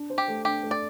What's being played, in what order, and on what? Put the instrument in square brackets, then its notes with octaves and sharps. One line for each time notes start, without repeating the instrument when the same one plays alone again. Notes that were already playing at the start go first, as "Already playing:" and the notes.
Already playing: [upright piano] D4
C5
[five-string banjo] G4
[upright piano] A3
[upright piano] D4 [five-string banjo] G4
[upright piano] A3
[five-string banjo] D5